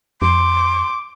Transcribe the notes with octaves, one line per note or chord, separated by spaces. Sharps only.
F2 C6 D6